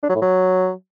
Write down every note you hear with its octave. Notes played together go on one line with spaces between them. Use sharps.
D4
F#3
A2
F#3